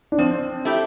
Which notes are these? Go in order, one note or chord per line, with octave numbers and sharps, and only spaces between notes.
D4
F3 C4
A3 E4 G4